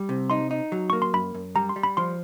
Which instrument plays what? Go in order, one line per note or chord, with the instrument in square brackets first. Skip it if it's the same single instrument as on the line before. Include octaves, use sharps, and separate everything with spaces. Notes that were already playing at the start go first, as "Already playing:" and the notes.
Already playing: [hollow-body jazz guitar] G3
C3
[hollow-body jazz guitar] D#4 [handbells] C6
[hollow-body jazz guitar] D#4
F#3
[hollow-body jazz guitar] A#3 [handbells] C#6
[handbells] C6
[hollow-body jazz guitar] F#2 [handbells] B5
[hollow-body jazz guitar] F#2
[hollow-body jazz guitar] G3 [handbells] A#5
[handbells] C6
[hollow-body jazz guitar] G3
[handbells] B5
[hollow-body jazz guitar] F3 [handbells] C6